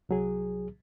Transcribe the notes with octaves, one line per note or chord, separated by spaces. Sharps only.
C2 F#3 G#4